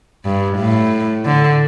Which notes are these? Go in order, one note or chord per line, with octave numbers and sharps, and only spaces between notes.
G2
A2
D3